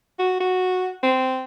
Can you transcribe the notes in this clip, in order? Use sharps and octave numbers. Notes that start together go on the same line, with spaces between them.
F#4
F#4
C4